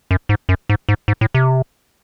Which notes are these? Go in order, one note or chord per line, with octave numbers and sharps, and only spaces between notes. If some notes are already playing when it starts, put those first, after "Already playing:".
F#2
G#2
F#2
G#2
G#2
G#2
A2
C3